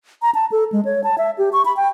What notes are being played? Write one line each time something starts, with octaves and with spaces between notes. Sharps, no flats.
A#5
A5
A4
G#3
C#5
A5
E5
G4
C#6
B5
G5